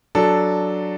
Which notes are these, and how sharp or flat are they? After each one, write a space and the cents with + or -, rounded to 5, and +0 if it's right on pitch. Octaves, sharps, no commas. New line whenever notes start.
F#3 +0 D4 +0 A4 -5